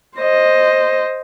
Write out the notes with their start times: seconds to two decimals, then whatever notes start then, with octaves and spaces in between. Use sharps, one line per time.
0.18 C5 D#5